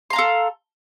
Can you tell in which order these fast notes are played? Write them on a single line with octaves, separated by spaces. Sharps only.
C6 A#5 F5 A4